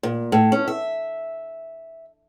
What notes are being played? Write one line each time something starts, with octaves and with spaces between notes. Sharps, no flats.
A#2
A2
C#4
E5